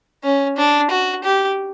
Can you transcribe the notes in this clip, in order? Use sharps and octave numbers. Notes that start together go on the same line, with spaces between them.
C#4
D4
F#4
G4